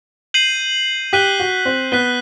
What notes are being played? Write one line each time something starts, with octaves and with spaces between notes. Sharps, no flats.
G6 C7 D#7 F#7
G4 F#6 B6 D#7 G7
F#4
C4
B3 F#6 B6 D#7 G7